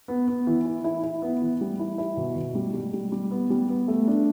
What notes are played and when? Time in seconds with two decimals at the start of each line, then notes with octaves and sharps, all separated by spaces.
0.08 B3
0.28 B3
0.47 E3
0.66 E4
0.84 E4
1.04 E4
1.22 B3
1.42 E3
1.61 G3
1.79 E4
1.98 E4
2.17 B2
2.36 B2
2.55 G3
2.74 G3
2.93 G3
3.12 G3
3.31 B3
3.50 G3
3.69 B3
3.88 A3
4.07 D4